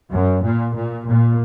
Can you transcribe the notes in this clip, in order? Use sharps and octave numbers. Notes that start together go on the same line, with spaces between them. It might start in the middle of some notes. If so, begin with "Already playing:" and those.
F#2
A#2
A#2
A#2